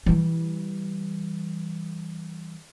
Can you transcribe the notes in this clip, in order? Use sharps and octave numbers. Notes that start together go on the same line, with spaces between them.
E3 G3